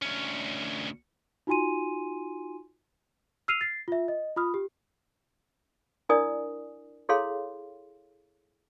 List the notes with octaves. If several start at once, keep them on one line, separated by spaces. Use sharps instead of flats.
D2 C#4
D#4 F4 F#4 G#5 C6 D#7
E6 F6 C7 D#7 F7
A6 C7
F4 E5
D#5
F4 B5 D#6 F6
G4
D4 E4 A#4 D5 G#5 D#6
E4 G#4 A4 C#5 F5 C6